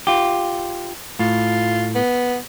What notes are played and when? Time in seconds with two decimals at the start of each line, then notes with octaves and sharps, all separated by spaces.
0.07 F4 G4
1.19 A2 F4
1.95 B3